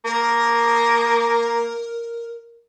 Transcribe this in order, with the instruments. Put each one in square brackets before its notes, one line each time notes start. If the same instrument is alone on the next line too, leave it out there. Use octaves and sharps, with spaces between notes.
[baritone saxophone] A#3 [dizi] A#4